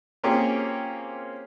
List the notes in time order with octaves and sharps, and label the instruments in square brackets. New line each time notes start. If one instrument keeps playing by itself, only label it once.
[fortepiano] A#3 C4 C#4 F4 G4 G#4